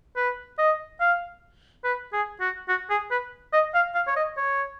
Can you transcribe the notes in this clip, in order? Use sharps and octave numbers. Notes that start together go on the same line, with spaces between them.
B4
D#5
F5
B4
G#4
F#4
F#4
G#4
B4
D#5
F5
F5
C#5
D#5
C#5